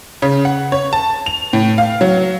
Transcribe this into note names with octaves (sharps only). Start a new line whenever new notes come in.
C#3
F#5
C#5
A5
F7
A2
F5
F#3